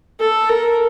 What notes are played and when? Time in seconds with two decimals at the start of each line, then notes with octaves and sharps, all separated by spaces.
0.20 A4
0.49 A#4